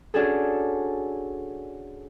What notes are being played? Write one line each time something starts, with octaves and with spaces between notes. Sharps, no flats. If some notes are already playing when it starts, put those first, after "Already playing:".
C#4 D4 F#4 G#4 A4